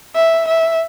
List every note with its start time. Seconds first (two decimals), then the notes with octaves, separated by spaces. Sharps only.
0.15 E5
0.48 E5